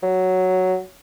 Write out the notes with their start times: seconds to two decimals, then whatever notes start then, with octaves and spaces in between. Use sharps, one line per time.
0.03 F#3